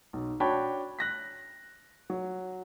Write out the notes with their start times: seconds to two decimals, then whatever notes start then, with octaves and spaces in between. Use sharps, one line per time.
0.13 B1
0.40 D4 F#4 C#5 G5 A5 B5
0.99 F#6 A#6 B6
2.10 F#3